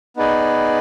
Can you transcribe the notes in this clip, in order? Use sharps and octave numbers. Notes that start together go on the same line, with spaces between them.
B3 D#4 G#4 B4 D5